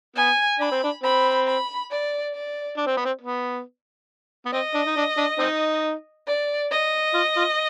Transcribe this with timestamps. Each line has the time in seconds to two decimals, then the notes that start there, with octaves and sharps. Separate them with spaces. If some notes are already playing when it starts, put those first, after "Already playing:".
0.16 B3 G#5
0.59 D4 B5
0.71 C4
0.84 D4
1.04 C4 B5
1.47 B5
1.91 D5
2.34 D5
2.77 D4
2.87 C4
2.97 B3
3.05 C4
3.22 B3
4.46 B3
4.53 C4 D#5
4.74 D4
4.87 D#4
4.97 D4
5.18 D4
5.39 C4 D#4
6.27 D5
6.71 D#5
7.14 F4
7.37 F4